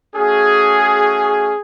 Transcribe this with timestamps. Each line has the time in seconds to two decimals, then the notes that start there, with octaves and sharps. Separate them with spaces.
0.16 A3 C#4 F#4 G#4